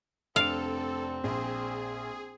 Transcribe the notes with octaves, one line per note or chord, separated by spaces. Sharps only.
F1 C4 D4 A4 F5 D7
A#1 G#4 C6